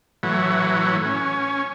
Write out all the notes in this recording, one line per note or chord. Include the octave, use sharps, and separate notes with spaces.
A2 E3 F#3
C#4